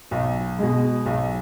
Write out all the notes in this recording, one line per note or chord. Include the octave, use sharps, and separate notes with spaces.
B1
B2 G#3
B1